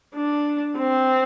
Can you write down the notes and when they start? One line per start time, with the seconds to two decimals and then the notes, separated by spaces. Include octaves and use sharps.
0.16 D4
0.78 C4